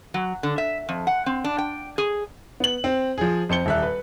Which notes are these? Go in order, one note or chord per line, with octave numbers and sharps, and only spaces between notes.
F#3
D3
E5
F2
F#5
C4
D4
G5
G#4
B3 F#7
C4
F3 G#4
F2 C5 C#7 G7
D#1 E5 F#6
B4